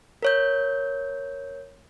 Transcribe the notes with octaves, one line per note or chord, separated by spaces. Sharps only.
A#4 C#5 G6